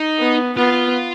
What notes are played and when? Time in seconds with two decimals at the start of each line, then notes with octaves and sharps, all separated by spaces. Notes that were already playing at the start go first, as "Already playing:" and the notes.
Already playing: D#4
0.19 B3
0.57 B3 F4